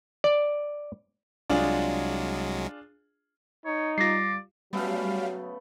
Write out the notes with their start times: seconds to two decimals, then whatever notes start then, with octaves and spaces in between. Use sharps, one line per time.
0.24 D5
1.50 C2 F#3 G#3 D4 F4 G#4
3.65 D#4 C#5
3.98 G3 F4 D5 A#6 C7
4.73 C#3 F#3 G3 A3 B3 F#4 F5